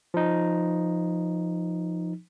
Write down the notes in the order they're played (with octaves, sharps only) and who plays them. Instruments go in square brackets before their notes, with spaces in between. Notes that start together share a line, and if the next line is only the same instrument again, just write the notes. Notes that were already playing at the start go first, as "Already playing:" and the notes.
[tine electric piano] F3 D#4